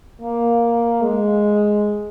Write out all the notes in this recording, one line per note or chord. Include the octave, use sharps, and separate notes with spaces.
A#3
G#3